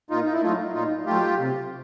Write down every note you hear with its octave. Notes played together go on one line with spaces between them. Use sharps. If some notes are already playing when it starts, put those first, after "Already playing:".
A#2 D#4 F4
D#4
E4
F#3 A3 D#4 F4
A#2 D#4 F4
F#3 A3 F4 G4
C3